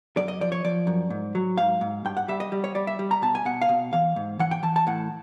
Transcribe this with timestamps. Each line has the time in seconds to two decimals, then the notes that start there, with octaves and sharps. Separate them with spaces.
0.17 F#2 D5
0.28 D#5
0.41 F3 D5
0.52 C#5
0.64 F3 D5
0.87 F#2
1.10 G#2
1.35 F#3
1.58 G#2 F5
1.81 G#2
2.05 G2 G5
2.17 F#5
2.28 G3 E5
2.40 D#5
2.52 G3
2.64 C#5
2.75 G3 D5
2.87 E5
2.99 G3
3.11 A#5
3.22 B2 A5
3.35 G#5
3.45 B2 F#5
3.62 F5
3.69 B2
3.93 E3 F5
4.16 G#2
4.39 E3 F#5
4.51 G5
4.63 E3 A5
4.76 A5
4.87 A2 F#5